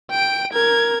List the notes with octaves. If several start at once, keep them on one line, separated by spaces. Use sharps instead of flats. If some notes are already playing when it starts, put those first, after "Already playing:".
G5 D7
A#4 G#6